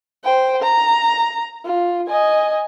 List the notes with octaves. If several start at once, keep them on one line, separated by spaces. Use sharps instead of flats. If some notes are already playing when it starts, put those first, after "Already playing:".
C5 G5
A#5
F4
D#5 G#5